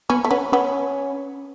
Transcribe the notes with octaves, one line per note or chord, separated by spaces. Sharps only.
B3 C#4
A3
B3 C#4
B3 C#4